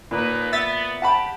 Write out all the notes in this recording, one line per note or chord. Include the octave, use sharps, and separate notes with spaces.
D#2 A#2 D#4 B4
B3 E5 A6 B6
G4 F#5 A5 B5